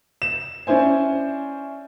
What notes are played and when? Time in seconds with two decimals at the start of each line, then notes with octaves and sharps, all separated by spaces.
0.22 E7
0.67 C#4 D4 E4 C5 G#5